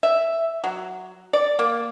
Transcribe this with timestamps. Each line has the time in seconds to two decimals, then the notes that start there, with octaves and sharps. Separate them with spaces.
0.03 E5
0.64 F#3
1.33 D5
1.59 A#3